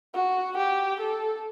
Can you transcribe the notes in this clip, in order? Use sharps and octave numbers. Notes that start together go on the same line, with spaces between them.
F#4
G4
A4